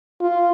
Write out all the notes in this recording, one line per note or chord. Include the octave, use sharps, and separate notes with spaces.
F4